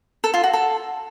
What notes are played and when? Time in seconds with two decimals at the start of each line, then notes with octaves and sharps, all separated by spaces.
0.24 A4
0.34 F4
0.44 F#4
0.53 A4